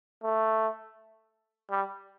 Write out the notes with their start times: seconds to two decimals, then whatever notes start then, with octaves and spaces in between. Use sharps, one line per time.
0.23 A3
1.70 G3